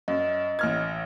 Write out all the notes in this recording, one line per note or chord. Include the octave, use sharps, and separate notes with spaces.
F#2 D#5
A1 F6 G#6